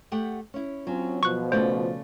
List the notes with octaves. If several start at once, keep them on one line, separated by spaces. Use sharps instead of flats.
A3 G4 F#5
C#4 E4
F#3 C4 C#4 F4
B2 F3 C#6 F#6
C#3 A3 C5 D5